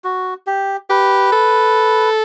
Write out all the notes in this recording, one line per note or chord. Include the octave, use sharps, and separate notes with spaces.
F#4
G4
G4 B4
A4